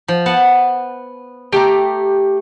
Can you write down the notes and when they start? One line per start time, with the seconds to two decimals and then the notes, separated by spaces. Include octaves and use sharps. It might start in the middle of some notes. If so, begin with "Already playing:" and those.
0.08 F3
0.26 B3 F#5 A5
1.52 A3 G4 A#5